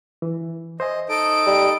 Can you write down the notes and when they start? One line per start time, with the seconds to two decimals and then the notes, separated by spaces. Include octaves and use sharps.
0.22 E3
0.80 C5 D#5 E5 G#5
1.09 D#4 A4 D7
1.46 G3